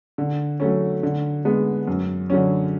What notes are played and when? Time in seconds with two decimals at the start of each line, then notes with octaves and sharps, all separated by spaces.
0.18 D3
0.60 F#3 A3 C#4
1.03 D3
1.45 G#3 B3
1.87 F#2
2.30 D3 F#3 C#4